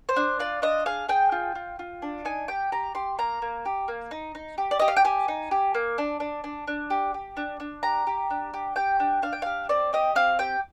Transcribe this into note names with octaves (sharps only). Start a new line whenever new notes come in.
C5
D4
F4 D5
D4 D#5
G#4 F5
G#4 G5
F4
F4
F4
D4
D#4 G#5
G4 G5
G4 A#5
G4 C6
A#3 A#5
A#3
G4
A#3
D#4
D#4
G4
D5
G4 D#5
F5
G5
G4 G#5
D#4
G4
A#3
D4
D4
D4
D4
G4
G4
D4
D4
G4 A#5
G4
D4
G4
G4 G5
D4
D4 F5
G5
G4 F5
C4 D5
G4 D#5
C4 F5
G4 G5